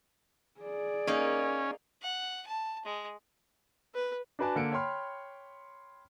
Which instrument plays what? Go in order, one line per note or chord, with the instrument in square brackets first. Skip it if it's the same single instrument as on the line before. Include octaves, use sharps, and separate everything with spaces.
[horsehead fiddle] G#4 D5
[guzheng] A#3 D#4 [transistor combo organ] C#4
[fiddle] F#5
A5
G#3
[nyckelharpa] B4
[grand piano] D4 F#4 B4 D5 G#5 A5
D3 A#3 A4 C#7 D7
C#5 G5 B5 C6 F6